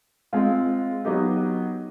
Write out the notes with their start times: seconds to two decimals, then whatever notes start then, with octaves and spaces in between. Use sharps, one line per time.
0.33 G#3 C4 F4
1.05 F#3 B3 D#4 G4